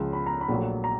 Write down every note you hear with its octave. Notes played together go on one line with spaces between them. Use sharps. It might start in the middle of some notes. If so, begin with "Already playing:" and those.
Already playing: C#2 C#3 F3
B5
A#5
B5
A#1 A#2 F#3 A3
A#5